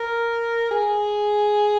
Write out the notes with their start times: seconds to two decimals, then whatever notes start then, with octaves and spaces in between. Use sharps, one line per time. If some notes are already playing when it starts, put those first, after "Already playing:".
Already playing: A#4
0.71 G#4